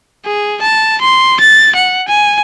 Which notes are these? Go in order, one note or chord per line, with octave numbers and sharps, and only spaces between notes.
G#4
A5
C6
A6
F#5
G#5